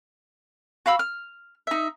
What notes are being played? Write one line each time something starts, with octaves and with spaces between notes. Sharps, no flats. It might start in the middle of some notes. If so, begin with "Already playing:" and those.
F#4 F5 B5 E6
F6
D#4 E5